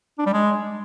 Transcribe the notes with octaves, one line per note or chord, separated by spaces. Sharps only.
D4
G3
G#3